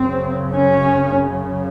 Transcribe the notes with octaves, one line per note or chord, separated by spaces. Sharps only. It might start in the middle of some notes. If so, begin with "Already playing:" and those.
Already playing: F#2 C#3 C4
C#4